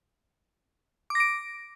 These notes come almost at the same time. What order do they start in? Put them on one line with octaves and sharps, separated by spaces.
D6 A#6 D7